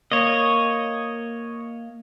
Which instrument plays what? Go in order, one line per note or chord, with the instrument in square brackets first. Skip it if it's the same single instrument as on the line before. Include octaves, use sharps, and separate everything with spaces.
[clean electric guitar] A#3 [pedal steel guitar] C#5 D#5